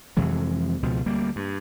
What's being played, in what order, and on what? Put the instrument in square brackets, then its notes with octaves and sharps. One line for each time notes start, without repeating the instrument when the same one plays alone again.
[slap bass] F2 C3 E3 G#3
C#2 B2 F3
D2 G3 A#3
G2